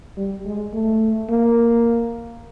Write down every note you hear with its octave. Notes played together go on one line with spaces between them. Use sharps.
G3
G#3
A3
A#3